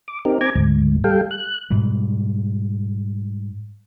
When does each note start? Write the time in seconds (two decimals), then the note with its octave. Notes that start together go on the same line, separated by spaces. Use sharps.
0.08 D6
0.25 C4 D#4 G4 A#4
0.41 C4 G#5 A#5 D6 G#6
0.55 D2 G#2
1.04 G3 A4 F5 G5
1.31 F#6
1.70 G#2 B2 G3